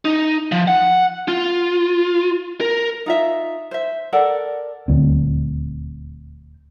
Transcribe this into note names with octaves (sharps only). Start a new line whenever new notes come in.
D#4
F3
F#5
F4
A#4
D#4 F4 E5
C5 E5
A4 A#4 D5 F#5
D#1 D2 C4